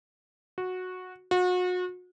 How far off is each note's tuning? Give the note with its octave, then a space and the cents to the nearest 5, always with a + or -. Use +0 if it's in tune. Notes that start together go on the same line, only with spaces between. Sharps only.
F#4 -10
F#4 -35